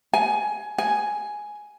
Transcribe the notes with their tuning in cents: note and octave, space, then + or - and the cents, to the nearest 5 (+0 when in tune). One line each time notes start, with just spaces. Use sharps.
G#5 +15
G#5 +5